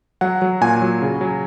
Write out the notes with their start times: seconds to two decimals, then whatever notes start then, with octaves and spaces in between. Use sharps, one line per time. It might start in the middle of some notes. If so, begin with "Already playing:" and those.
0.21 F#3 F#5
0.42 F#3
0.61 A#2 G#5
0.82 F#3
1.02 C#3
1.21 F#3